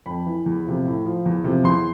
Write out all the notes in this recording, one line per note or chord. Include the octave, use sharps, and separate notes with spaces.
F2 B5
E3
E2
C3 F3
A2
F3
E2
C3 F3
E2 C6